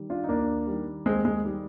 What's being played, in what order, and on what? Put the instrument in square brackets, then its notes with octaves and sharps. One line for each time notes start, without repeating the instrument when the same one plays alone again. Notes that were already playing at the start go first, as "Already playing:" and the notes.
Already playing: [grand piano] D#3 G3
D4 F4
D#4
D#2 A#3 D4
D#3 G3
D#2 G#3 C4
G#3
D#3 G3